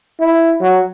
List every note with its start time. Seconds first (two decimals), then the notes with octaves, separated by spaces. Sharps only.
0.20 E4
0.61 F#3